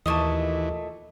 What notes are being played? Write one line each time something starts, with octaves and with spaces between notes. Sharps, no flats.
D#2 A#2 E3 A3 D#5 A5 C#6 D#6